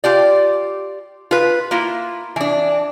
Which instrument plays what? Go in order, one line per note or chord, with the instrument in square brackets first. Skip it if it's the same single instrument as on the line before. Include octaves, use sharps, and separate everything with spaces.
[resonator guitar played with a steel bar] F4 G4 D5
F4 B4
A#3 E4 F4
E3 D4